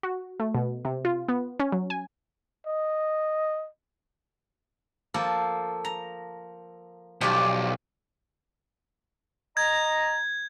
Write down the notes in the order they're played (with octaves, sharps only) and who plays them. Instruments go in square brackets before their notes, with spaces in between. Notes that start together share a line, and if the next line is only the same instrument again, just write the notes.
[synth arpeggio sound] F#4
A3
B2
C3
F4
B3
C#4
F#3
G#5
[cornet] D#5
[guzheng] F3 A#3 A4
A#5
[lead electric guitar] B1 [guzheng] F3 G4 D5
[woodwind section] D#5 A#5 [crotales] G#6